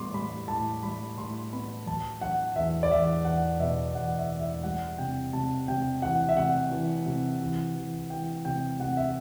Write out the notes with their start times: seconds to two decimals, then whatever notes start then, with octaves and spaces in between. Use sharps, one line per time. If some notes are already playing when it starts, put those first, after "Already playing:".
Already playing: A2 G3 B3 C6 D6
0.14 G3 B5
0.48 A2 A5
0.83 G3 B5
1.17 A2 C6
1.52 B3 B5
1.86 F#3 A5
2.21 F#3 F#5
2.55 E2 E5
2.83 D5
2.91 E2 E5
3.25 E2 F#5
3.59 B2 E5
3.94 E2 F#5
4.18 E5
4.29 E2
4.40 E5
4.63 G3 F#5
4.98 C3 G5
5.33 C3 A5
5.68 C3 G5
6.02 E3 F#5
6.29 E5
6.36 C3 F#5
6.71 E3
7.06 C3
7.41 E3
7.75 E3
8.10 E3 G5
8.45 C3 G5
8.79 C3 F#5
8.97 E5